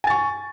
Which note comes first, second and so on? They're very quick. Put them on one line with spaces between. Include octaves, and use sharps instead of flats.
G#5 A6 C#6